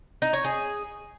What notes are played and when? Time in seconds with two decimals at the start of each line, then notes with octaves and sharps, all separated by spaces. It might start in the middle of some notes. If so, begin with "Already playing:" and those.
0.22 D#4
0.33 C#5
0.44 G#4